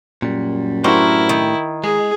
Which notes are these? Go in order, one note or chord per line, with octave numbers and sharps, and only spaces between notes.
F#2 A#2 G3
A2 D4 E4 F#4 G4 A#4 C5
D#3
G#3 G#4